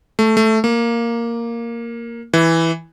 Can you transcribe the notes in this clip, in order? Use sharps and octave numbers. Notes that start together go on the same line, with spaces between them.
A3
A3
A#3
E3